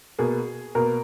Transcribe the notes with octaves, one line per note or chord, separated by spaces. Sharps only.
B2 A#3 G#4
B2 A#3 A#4